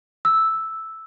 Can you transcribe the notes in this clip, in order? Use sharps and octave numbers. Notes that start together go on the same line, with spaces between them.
E6